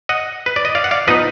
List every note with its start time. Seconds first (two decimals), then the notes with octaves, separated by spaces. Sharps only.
0.09 D#5 F#5
0.46 B4
0.56 D5
0.65 D#5
0.75 D5 F5
0.84 F#5
0.91 D5 F5
1.07 F3 B3 D#4 B4 D#5